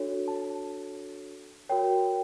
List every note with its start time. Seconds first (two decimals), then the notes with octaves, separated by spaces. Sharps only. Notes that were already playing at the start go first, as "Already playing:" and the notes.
Already playing: D4 F#4 A4 C#5
0.28 A5
1.69 F#4 A#4 C#5 G5